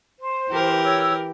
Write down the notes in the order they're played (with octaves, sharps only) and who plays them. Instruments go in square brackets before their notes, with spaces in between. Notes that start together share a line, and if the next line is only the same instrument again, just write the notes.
[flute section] C5
[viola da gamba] E3 G4 A#4
[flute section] C#5 E6